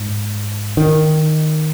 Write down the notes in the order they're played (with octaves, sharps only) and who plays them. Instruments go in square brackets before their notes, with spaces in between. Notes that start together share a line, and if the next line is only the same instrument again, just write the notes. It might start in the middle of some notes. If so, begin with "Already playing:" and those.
Already playing: [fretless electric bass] G#2
D#3